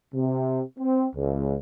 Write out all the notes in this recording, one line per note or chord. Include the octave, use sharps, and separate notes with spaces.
C3
C4
C#2